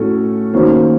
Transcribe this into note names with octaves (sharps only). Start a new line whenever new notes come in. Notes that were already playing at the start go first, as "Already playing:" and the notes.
Already playing: A2 A3 C#4 F#4 A4
D#3 A#3 C#4 F#4 C5